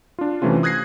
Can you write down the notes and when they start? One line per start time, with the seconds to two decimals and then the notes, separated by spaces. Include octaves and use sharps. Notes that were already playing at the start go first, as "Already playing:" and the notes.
0.19 D4 F4
0.42 C3 E3 A3 C#4 F4
0.63 D#6 F#6 G#6 A#6 C7